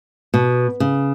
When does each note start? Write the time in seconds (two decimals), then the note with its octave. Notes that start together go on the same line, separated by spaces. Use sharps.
0.34 B2
0.80 C#3